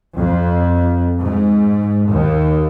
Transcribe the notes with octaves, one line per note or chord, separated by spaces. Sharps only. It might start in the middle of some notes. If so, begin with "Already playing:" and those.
F2
G#2
D#2